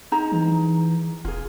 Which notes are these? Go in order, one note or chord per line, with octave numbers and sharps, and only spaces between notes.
D#4 G#4 A#5
E3
E1 F4 G#4